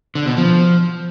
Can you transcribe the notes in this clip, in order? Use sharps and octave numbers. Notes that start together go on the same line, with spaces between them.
D3
B2
F3